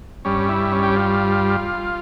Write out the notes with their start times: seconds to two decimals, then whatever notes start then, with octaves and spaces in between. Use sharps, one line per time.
0.25 G2 G3 C#4
0.49 E4
0.72 C#4
0.83 G4
0.96 F4